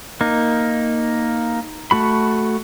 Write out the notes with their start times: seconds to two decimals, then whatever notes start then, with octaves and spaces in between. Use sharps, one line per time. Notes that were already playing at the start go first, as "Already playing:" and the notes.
0.21 A#3 D#4
1.91 A3 F#4 B5